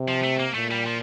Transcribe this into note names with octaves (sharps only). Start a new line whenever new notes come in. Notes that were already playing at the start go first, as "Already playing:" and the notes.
Already playing: C3
F3
A3
A#3
A#2 A3
G3
F3